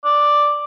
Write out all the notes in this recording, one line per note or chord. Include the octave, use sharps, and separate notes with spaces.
D5